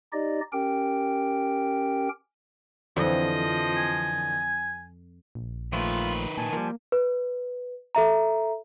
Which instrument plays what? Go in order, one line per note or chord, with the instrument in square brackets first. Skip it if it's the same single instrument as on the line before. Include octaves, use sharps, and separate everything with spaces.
[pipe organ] D#4 G4 D5 D#5
C#4 G4 A#4 G5
[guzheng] F2 [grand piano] D3 E3 [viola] F3 D#5
[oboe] G#5
[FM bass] A#1
[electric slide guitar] A#2 F3 A3 [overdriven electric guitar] D#3 B4 [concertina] F4
[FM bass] A#2 [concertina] G#5 A5
[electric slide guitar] F3 G3 [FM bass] A#3
[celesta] B4
A4 E5 A#5